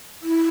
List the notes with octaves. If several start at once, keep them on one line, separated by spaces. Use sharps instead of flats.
E4